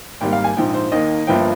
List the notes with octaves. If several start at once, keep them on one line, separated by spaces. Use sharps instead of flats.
G#1 G#2 G3 A#3 G5
F5
G#5
A#1 G#2 F3 G5
C5
D#2 D#3 A#3 D#5
G1 G2 F3 A#3 G5